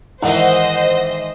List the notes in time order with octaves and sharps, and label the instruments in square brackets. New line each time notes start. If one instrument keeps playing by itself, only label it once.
[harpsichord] G#2 D#3 E3 [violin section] C5 D#5 [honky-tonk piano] F#5